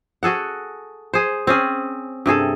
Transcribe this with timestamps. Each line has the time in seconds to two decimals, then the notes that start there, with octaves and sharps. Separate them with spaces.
0.23 F#4 G#4 A4 F#5
1.14 G#4 C5
1.47 C4 C#4 G#4
2.26 G2 C3 G#4 A4